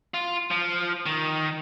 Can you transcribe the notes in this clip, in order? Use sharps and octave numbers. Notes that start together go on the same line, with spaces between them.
F4
F3
D#3